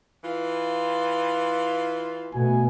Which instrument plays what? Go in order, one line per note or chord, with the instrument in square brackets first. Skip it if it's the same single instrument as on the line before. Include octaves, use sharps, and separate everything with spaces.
[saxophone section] E3 F4
[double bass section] B2 [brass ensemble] A3 F#4 G#5